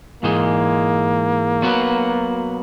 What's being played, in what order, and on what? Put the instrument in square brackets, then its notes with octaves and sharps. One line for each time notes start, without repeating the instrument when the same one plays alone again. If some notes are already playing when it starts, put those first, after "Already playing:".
[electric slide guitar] G#2 E3 G#3 D#4 [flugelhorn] A#3
[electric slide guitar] F#3 B3 F#4 B4